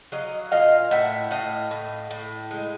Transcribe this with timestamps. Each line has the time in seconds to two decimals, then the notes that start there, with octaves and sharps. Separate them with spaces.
0.12 F#3 D#5 F5
0.52 A#2 D#5 F5
0.91 A2 E5 F#5
1.31 A2 D#5 F5
1.71 A2
2.11 A2
2.51 G#3